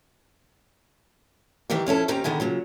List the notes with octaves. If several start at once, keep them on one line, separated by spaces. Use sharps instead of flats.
D#3 E3 G3 D#4 G4
F2 C#4 E4 A4
D#2 C4 C#4 D#4 G4 A#5
D3 D#3 B3 D#4 G#4
A#2 C#3 F#3